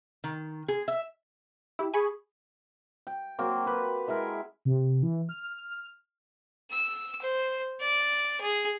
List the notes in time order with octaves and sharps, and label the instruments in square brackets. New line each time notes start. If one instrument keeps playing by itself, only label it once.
[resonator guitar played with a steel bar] D#3
G#4
E5
[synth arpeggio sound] E4 G4
[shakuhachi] G#4 [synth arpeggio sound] G#5 B5 C#6
[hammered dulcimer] G5
F#3 A#3 C4
G4 B4
G#3 E4 G#4 A#4
[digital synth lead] C3
E3
F6
[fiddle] E6
C5
D5
G#4